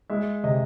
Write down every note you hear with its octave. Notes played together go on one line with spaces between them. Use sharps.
G#3 E5
C3 D#5